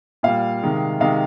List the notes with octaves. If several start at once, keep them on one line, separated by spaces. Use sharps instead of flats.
A#2 G3 F5
C3 D#3 G#3
C3 D#3 G#3 F5